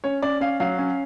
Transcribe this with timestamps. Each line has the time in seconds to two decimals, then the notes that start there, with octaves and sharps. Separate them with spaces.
0.04 C#4 C#5
0.23 C#4 D5
0.41 C#4 F5
0.60 F#3 F5
0.79 C#4